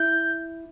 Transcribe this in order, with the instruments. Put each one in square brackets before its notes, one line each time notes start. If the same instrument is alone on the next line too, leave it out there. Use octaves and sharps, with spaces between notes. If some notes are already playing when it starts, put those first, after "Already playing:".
Already playing: [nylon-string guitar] E4 [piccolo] G6